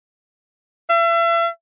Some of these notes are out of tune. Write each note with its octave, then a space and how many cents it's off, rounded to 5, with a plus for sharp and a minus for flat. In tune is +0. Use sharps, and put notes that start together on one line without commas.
E5 +35